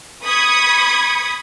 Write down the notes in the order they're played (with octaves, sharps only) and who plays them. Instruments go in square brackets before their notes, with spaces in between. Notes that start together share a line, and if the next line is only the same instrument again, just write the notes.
[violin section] B5 C#6 D#6 G#6